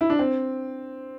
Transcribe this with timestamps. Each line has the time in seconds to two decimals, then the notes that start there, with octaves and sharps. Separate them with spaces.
0.01 E4
0.10 D4
0.19 C4